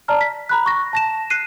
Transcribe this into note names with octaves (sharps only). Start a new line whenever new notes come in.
D5 A5 A#5 F6
B6
A#5 B5 F#6
C#6 A#6
A5 A#6 E7
F#6 C7 D#7